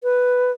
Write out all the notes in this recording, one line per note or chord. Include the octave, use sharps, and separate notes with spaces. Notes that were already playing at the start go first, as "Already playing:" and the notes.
B4